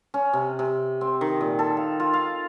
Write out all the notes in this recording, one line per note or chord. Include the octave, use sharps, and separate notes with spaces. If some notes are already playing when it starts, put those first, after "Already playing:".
C#4
C3
C3
C4
D#3
A#2
A4
F5
F4
F5